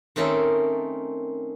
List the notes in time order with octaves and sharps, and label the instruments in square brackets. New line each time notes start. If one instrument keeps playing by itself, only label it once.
[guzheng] D#3 A3 C4 C#4 A4 A#4